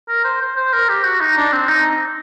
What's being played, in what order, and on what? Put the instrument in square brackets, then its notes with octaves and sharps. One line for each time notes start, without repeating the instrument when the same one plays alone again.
[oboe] A#4
C5
C5
C5
A#4
G4
F#4
D#4
D4
C4
D#4